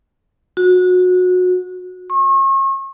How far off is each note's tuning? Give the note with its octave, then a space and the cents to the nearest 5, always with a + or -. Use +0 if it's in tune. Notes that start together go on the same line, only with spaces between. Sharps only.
F#4 -25
C#6 -40